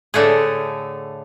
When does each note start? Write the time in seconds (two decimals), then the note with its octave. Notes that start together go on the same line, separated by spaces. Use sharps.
0.14 A2 D3 A3 G#4